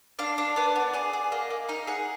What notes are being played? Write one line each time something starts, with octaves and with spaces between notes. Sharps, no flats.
D4 F5
D4
B3 D5
B3
G#4 D5
G#4
A#3 D#5
A#3
D#4 F5
G#4 F#5